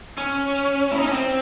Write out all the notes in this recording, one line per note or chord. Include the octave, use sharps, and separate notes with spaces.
C#4
E4
D#4
C#4
C4